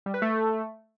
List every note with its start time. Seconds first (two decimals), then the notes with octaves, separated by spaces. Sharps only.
0.06 G3
0.14 B4
0.22 A3